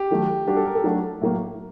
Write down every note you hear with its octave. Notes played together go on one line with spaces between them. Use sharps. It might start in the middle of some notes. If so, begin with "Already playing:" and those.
Already playing: G4
D#3 F#3 A3
G3 D4 F#4 G4
A4
A#4
A4
F#3 A3 D4 F#4
A2 F#3 A#3